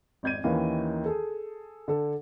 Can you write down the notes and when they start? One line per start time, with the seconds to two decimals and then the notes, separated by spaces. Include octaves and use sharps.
0.23 G#1 F2 G6 G#6 D#7
0.44 D#2 D#3 E3 C#4 F5
1.05 G#4 A4
1.88 D3 A4